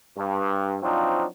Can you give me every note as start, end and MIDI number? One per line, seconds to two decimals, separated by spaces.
0.18 0.77 43
0.83 1.25 53
0.83 1.25 54
0.83 1.25 60
0.83 1.25 62
0.83 1.25 63
0.83 1.25 65